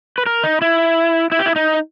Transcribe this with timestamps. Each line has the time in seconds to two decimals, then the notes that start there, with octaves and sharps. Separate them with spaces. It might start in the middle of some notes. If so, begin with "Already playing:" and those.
0.18 B4
0.26 A#4
0.44 D#4
0.62 E4
1.32 E4
1.39 G4
1.46 E4
1.56 D#4